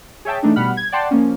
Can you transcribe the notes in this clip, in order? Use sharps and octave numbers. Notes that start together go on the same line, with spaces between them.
G#4 C#5 E5 G5 A5
E3 A3 D4 D#4
B2 G3 F#5 B5 F6
G#6
D5 F#5 G5 A5 C6
F3 A#3 C#4